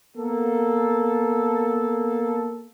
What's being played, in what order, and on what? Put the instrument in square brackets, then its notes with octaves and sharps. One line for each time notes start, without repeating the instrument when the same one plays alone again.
[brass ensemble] A#3 B3 A4